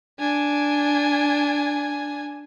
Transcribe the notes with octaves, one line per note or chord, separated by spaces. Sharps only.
D4 G#5